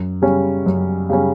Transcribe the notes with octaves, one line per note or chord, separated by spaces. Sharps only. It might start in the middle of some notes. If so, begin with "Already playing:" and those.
Already playing: F#2
C#3 G3 C#4
F#2
C#3 G3 C#4